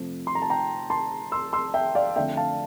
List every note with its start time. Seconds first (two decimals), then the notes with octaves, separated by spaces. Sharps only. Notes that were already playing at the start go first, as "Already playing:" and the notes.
Already playing: F2 C3 F3 A3
0.27 C6
0.35 A#5
0.42 A5
0.50 G5 A#5
0.90 A5 C6
1.32 C6 E6
1.53 C6 E6
1.74 E5 G5
1.95 D5 F5
2.16 F2 D3 A3 E5 G5
2.37 F5 A5